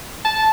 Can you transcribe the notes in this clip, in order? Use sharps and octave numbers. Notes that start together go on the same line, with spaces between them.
A5